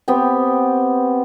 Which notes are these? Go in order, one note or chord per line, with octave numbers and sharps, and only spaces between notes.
B3 C4 G4